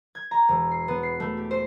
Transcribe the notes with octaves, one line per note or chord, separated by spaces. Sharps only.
G#6
A#5
E1
C7
B3
C7
A3
G4
C5